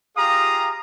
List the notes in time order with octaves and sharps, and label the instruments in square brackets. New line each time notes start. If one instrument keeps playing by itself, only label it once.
[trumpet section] F4 G4 G#4 F5 A#5 D#6